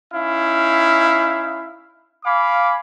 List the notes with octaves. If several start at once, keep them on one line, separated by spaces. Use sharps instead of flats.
C#4 D#4 E4 F5
F5 G#5 B5 D6